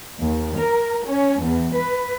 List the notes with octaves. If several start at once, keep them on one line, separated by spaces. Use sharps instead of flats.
D#2
A#4
C#4
E2
B4